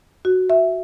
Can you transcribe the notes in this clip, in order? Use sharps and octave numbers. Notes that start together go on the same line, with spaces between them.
F#4
E5